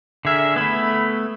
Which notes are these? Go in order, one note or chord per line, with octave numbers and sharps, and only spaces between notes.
D3 G#4 A#4 E5
A3 B3 E4 B5